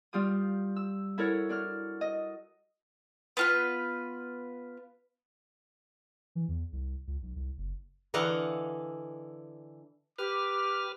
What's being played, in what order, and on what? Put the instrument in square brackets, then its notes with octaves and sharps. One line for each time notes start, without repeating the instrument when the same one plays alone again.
[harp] G3 F4 G4 D#6
E6
E4 F#4 A4 A#4 C#5
D4 F#4 F6
D#5
[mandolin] B3 F4 B4
[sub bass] E3
E2
C2
C#2
B1
C2
F#1
[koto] D3 E3 D#5 F5 F#5
[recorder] G4 [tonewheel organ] B4 F6 [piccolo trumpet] D6